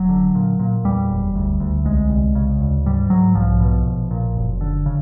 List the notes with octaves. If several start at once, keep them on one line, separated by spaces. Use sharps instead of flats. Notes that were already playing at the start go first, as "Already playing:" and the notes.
Already playing: F1 F#3
D3
A#2
A#2
E2 G3
F#1
D2
D2
C2 G#3
C2
C#3
D2
G#2 G3
G#2 F#3
B1 F3
B2
A#1
A#2
F#1
D3
C#3